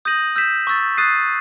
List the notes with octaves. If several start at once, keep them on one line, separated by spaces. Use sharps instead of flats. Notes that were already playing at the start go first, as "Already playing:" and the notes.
D#6 G6 A#6 D#7 F#7
E6 G6 B6 E7
C#6 E6 A6
D#6 F#6 A6 C7 D#7